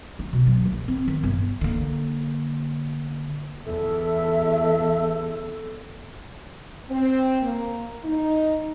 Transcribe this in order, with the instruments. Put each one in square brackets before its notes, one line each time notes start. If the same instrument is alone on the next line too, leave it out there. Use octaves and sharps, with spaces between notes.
[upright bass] D#4
B2
F#3
A#1
C4
D#3
G1
D3 A#3
[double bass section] E2 [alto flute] A4 [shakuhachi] E5
[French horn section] C4
A#3
D#4